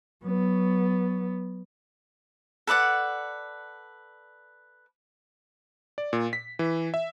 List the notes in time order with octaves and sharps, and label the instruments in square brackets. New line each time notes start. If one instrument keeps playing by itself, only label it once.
[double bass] F#3 B3
[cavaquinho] A4 B4 D5 F#5
[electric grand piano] D5
A#2
B6
E3
E5